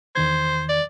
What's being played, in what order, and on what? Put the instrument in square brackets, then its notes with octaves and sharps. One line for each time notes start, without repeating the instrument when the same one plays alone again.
[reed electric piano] E2 D#3 G#6 [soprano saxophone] C5
[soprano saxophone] D5